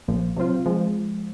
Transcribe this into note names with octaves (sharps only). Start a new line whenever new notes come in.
A#1 A#2 F3
C3 F#3 C4 F4
F3 G#3